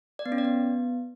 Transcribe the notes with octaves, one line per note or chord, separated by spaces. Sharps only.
D5
B3
C#4
D5
B3